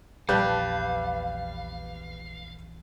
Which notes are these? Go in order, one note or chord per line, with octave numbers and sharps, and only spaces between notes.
A#1 E2 G3 B4 F5 A5